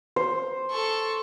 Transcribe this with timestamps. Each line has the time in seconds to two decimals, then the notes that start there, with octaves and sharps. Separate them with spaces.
0.16 C5
0.71 A4 C#6